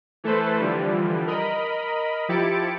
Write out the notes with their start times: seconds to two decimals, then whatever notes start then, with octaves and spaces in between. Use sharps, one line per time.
0.24 E3 A3 A4 B4 C5
0.59 D3 E3 F3 G3
1.27 A#4 D#5 B5
2.29 F3 E4 G4 A6 C#7 D7